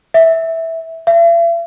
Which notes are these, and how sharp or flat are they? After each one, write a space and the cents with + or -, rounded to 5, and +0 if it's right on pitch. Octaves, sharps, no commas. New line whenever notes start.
E5 -10
E5 +45